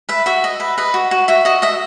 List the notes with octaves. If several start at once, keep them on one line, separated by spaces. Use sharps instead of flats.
B4 E5
F#4 E5
D#5
B4
B4 D#5
F#4
F#4
F#4 E5
F#4 D#5
D#5 E5